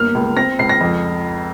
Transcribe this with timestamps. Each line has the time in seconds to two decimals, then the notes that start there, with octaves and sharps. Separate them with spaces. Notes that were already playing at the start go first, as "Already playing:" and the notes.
Already playing: G1 A#3 F6
0.15 C#2
0.37 C4 A#6
0.59 C#2 C7
0.69 A#6
0.81 F2